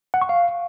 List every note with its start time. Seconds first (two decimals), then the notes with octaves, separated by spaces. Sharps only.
0.14 F#5
0.22 C#6
0.29 F5